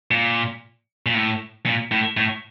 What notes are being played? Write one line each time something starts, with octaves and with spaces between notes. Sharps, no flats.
A#2
A#2
A2
A#2
A2
A2